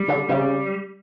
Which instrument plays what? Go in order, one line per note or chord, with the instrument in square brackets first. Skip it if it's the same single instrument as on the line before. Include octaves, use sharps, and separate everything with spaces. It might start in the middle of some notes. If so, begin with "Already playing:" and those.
Already playing: [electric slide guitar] G3
[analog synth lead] D3
[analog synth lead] C#3 [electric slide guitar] G3